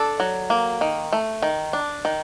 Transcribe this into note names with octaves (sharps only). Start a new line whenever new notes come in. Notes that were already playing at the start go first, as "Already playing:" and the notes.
Already playing: D4 A4
F#3
A#3
D#3
A3
D#3
D4
D#3